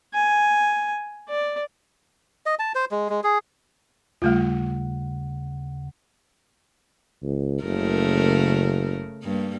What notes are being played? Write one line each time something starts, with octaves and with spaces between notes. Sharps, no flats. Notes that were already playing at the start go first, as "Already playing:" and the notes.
G#5
D5
D#5
A5
C5
G#3
G#3
G#4
D#2 C#3 G3 A3 F4 F#5
C#2
F#1 C#3 A3 A#4
G2 G3 A#3